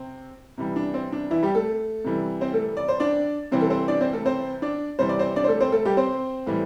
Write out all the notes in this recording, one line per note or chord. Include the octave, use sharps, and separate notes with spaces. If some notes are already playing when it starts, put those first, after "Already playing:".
Already playing: C3 C4
C3 E3 G3
D4
C4
D4
E3 E4
G3 G4
A3 A4
C3 E3 G3
C4 C5
A3 A4
D5
C5
D4 D5
C3 E3 G3 C4 C5
A4
C4 C5
D4 D5
C4 C5
A3 A4
C4 C5
D4 D5
C3 E3 G3 C5
D5
C4 C5
D4 D5
C5
A3 A4
C4 C5
A3 A4
G3 G4
C4 C5
A2 E3 G3